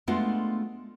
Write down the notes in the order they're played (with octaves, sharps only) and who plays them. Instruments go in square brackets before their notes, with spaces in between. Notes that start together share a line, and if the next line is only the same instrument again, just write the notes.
[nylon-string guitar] G#3 A3 B3 D4 F4 F#5